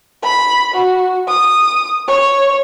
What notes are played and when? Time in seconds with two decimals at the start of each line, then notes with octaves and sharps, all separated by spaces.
0.23 B5
0.74 F#4
1.28 D#6
2.08 C#5